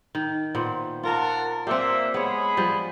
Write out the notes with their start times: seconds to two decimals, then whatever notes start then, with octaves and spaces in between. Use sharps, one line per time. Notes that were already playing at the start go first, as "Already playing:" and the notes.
0.15 D#3
0.55 A#2 B3 C5
1.04 A#3 F4 A#4 F#5 A5
1.67 A#2 A#3 C4 G4 E5
2.14 G#3 B3 G#4 C#5 B5
2.57 F3 G3